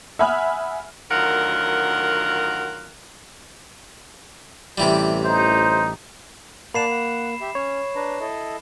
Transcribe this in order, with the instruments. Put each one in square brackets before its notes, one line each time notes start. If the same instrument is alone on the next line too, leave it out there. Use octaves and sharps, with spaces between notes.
[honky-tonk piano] E5 F#5 G#5 B5 D#6 F6
[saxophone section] D2 D#3 F#3 F4 A#4 F#5
[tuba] A1 [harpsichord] C3 E3 G3
[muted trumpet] D#4 [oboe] C5
[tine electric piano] A#3 [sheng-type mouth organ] D5 F#5 A5 [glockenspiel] B5 C7 E7
[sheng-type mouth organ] F#5
G4 E5
[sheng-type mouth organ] C#4 [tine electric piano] C#5
[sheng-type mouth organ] D4 B4 A#5
E4 A4 D#5